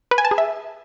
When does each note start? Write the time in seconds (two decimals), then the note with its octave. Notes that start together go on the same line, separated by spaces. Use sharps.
0.11 B4
0.18 G#5
0.25 A5
0.31 G#4
0.38 E5